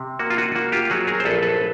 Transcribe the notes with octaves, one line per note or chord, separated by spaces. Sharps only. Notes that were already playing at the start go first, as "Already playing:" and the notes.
Already playing: C3
A#3 F#4
F4
F#4
A#3 F#4
F4 G4
F#3 F#4 G#4
G#4 A#4
C5
A#1 A4 B4
A4 B4